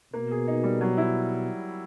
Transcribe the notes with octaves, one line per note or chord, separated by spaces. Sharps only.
B2 A#3
G#4
D#4
G3
F#3
E4